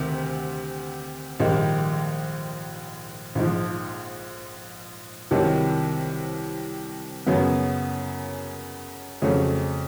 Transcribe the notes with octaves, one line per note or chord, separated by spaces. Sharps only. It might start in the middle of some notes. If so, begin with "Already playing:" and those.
Already playing: D2 C3 D#3
A#1 G#2 D#3 G3
A#1 G#2 F3
C2 C3 D#3 F#3
F#2 C#3 F#3 B3
F2 C#3 F#3 A3